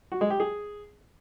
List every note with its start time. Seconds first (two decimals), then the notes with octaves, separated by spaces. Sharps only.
0.12 F#4
0.21 G#3
0.30 G4
0.40 G#4